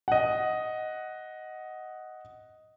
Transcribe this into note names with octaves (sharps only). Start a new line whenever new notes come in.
D#5 F#5